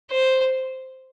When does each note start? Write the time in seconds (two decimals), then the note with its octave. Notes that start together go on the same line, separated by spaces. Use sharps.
0.11 C5